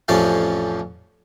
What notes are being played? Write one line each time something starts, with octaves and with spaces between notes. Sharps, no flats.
A1 F2 F3 C#4 D5 F5